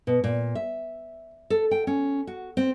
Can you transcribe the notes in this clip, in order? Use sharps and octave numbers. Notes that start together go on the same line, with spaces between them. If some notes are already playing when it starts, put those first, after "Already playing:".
B2
A#2
E5
A4
G5
C#4
F#4
C4